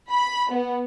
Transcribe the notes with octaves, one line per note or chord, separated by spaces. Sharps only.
B5
B3